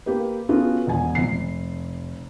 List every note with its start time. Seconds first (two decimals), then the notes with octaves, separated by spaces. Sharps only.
0.06 A#3 G4 B4
0.49 B3 C#4 F4 F#4 G#4 A4
0.87 E1 G#5
1.15 F1 C7